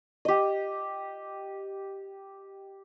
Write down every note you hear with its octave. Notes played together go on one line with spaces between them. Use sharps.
G4 D#5